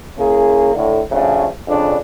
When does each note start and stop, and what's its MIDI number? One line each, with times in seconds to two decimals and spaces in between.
0.18 0.74 58
0.18 0.74 61
0.18 0.74 64
0.18 0.74 68
0.75 1.00 45
0.75 1.00 50
1.11 1.47 49
1.11 1.47 53
1.11 1.47 54
1.11 1.47 57
1.11 1.47 62
1.68 1.97 41
1.68 1.97 49
1.68 1.97 62